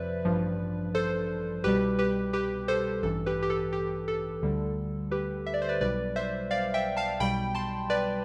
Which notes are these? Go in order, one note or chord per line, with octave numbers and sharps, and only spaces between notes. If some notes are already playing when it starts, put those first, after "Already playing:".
Already playing: F2 C3 F3 B4 C5 D5 E5
A1 G2 F3
A4 C5
C2 B2 G3 G4 B4
G4 B4
G4 B4
A4 C5
A1 G2 E3 A4
G4 B4
G4
A4
G4
A4
D2 D3 G3
G4 B4
E5
D5
C5
B4 D5
B1 B2 G3 B4 D5
C5 E5
D5 F5
E5 G5
F5 A5
B1 B2 G3 G5 B5
A5 C6
B4 D5